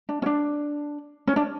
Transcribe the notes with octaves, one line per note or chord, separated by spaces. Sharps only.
D4
C#4
D4
C#4
D4